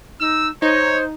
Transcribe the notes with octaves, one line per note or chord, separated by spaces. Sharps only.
D#4 E6
D#4 C5 C#5